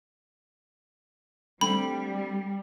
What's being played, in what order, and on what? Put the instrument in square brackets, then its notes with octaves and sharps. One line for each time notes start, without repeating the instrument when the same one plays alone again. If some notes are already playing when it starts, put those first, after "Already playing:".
[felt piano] D3 A3 C4 [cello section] G3 [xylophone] B5